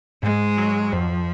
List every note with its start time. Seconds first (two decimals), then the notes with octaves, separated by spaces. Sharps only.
0.23 G#2 G#3
0.58 F#3
0.93 F2 F3